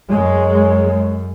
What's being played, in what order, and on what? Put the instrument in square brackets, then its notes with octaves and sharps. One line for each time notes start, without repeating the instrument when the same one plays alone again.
[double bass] F#2 [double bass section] G#3 [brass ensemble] C#5